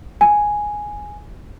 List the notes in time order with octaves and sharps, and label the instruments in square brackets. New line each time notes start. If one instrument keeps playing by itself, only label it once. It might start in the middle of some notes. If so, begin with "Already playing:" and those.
[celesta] G#5